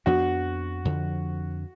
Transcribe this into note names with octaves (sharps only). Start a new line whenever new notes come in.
F2 F3 B3 D4 F#4
F2 D3 F3